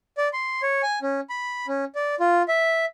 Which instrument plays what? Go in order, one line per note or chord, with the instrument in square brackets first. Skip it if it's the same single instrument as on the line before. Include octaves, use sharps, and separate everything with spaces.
[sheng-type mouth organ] D5
C6
C#5
G#5
C#4
B5
C#4
D5
F4
E5